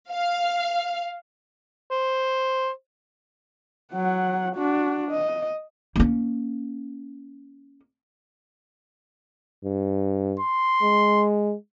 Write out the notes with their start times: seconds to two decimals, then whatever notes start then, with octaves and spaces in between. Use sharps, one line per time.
0.11 F5
1.91 C5
3.93 F#3 F#5
4.55 D4 F#4
5.11 D#5
5.96 A#3 C#4
9.64 G2
10.40 C6
10.82 G#3